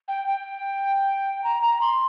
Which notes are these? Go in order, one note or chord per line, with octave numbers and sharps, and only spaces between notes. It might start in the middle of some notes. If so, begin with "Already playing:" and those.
G5
G5
A#5
A#5
C6